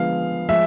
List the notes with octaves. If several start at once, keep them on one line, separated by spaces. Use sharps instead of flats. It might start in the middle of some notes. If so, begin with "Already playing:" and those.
Already playing: D3 F3 G#3 B3 F5
F3 G#3 E5